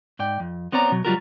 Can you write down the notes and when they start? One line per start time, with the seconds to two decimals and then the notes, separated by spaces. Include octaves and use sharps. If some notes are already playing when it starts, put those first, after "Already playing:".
0.19 G#2 D5 G5
0.40 F2
0.72 B3 C4 C#5 D5 A#5
0.92 B2 F#3
1.05 C#2 F#3 G3 F4 F#4 A#4